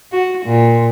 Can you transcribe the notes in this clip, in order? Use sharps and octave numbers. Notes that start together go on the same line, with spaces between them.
F#4
A#2